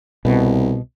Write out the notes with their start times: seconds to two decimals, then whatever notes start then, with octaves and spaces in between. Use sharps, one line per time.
0.25 C2 B2